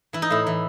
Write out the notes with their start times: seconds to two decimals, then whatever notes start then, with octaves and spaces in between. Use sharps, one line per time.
0.13 E3 E4
0.22 D#4
0.30 A2 E4
0.47 E3